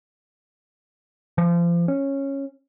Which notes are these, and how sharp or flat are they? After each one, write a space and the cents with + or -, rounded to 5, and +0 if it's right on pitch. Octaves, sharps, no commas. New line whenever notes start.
F3 -30
C#4 -10